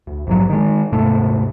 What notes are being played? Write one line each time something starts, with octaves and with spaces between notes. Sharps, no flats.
D2
A#1 G#2 F#3
D#3 G#3
D#1 G#2 C3 A3